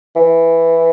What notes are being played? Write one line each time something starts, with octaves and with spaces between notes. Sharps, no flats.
E3